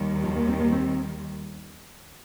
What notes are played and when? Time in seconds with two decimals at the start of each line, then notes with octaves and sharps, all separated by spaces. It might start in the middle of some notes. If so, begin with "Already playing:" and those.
Already playing: D#2 D#3 G3
0.24 F3
0.36 A#3
0.48 C4
0.60 A#3
0.72 C4